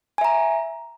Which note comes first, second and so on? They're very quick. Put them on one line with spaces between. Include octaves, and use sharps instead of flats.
G#5 E5 A#5